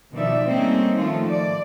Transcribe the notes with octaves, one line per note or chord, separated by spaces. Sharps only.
B2 D#3 F3 D#4 D5 E5
G3 A3 A#3 C4 C#4 D#4
D#3 F3 A3 F4
D5